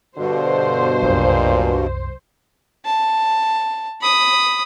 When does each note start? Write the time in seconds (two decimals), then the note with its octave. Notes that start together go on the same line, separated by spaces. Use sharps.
0.17 G2 B2 D3 C5
1.03 C2 F#2 A#2
2.86 A5
4.02 B5 D#6